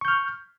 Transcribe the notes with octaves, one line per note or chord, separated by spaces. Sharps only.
C#6 F6 G6